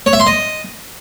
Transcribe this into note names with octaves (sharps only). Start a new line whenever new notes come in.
C#5
E5
C6
D#5